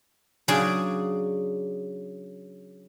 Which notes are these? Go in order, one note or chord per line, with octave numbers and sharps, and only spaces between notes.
C#3 F#3 D4 G#4 D5 G#5